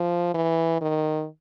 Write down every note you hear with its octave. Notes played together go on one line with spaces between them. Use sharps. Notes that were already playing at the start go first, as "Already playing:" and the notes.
Already playing: F3
E3
D#3